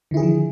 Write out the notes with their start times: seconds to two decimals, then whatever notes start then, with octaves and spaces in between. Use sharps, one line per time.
0.11 D3
0.14 E4
0.17 G#4
0.20 D#3
0.23 F3